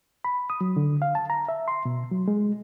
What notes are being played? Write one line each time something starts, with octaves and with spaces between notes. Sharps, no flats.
B5
D#6
F#3
D3
F5
A5
A#5
E5
C6
B2
F#3
G#3